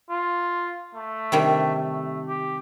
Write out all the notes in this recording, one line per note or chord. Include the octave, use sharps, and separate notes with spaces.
F4
A3
C3 D#3 G3
A3
G4